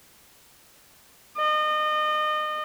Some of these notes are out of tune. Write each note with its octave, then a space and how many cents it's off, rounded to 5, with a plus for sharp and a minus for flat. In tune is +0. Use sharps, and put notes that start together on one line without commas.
D#5 -30